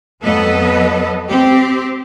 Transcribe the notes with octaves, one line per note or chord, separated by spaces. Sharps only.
F2 F#3 B3 A4 B4 D#5
C4 G4